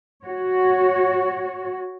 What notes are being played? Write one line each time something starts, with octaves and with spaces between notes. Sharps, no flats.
F#4 C#5